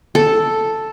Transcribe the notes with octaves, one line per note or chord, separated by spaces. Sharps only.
A4